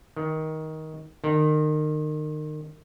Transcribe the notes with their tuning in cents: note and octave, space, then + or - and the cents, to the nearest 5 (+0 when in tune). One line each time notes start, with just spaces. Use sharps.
D#3 +15
D#3 -30